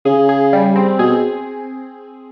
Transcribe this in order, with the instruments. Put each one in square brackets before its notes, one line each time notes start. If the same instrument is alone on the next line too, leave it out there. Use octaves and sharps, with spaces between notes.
[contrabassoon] C#3 [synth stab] G#4
[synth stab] G#4
G3
C4
[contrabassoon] B2 [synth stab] G#4